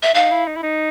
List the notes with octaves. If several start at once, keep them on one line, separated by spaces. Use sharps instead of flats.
E5
D#4 F5
E4
D#4
E4
D#4